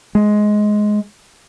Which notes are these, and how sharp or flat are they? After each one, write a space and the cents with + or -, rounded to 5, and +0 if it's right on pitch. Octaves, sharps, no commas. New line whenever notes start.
G#3 +10